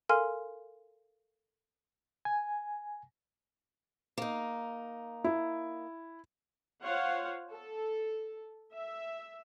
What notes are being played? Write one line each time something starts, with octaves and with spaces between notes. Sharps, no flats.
A4 A#4 F5 G#5 C6 F6
G#5
A#3 D#4
E4
F4 C5 C#5 F5 F#5
A4
E5